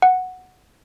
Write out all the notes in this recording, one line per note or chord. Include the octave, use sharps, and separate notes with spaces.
F#5